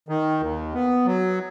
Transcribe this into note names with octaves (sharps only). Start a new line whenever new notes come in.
D#3
D#2
B3
F#3